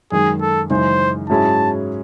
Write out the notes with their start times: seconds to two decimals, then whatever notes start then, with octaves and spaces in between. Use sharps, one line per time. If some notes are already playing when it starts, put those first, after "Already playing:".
0.12 F#2 D#3 G#3 G#4
0.41 A4
0.70 F#2 C#3 E3 G#3 D#4 C5
1.29 G#2 F#3 C#4 E4 G#4 A5